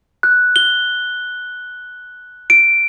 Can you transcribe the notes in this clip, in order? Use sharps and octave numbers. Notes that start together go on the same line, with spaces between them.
F#6
G7
D7